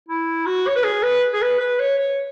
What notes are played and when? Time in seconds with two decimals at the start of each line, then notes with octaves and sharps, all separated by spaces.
0.08 E4
0.46 F#4
0.67 C#5
0.76 B4
0.84 G#4
1.03 B4
1.33 G#4
1.42 B4
1.60 B4
1.79 C#5
1.98 C#5